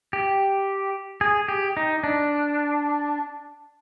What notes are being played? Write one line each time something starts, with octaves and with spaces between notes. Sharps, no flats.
G4
G#4
G4
D#4
D4